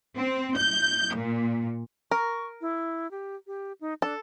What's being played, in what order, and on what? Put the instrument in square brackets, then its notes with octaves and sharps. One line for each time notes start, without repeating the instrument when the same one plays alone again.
[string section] C4
G6
A#2
[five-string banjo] A#4 [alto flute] C#6
[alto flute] E4
G4
G4
D#4
[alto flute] D4 [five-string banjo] A4